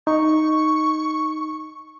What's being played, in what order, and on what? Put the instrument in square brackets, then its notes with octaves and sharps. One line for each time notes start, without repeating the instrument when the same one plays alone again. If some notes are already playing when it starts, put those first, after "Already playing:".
[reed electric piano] D#4 [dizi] C#6